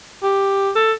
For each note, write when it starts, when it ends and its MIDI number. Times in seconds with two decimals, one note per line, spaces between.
0.23 0.70 67
0.75 0.92 69